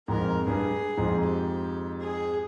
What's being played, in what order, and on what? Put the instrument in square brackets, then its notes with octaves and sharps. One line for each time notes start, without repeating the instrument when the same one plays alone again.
[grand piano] F2 G#2 [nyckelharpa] A#4
[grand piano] G2 [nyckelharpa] G#4
[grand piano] F2 G#2
[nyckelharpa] G4
G#4